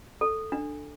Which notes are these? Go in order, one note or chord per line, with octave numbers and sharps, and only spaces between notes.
A4
D4